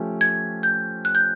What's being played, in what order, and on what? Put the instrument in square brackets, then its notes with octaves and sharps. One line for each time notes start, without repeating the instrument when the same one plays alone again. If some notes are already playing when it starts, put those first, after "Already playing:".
Already playing: [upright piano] F3 A3 C#4 G4
[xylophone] G#6
G6
F#6
G6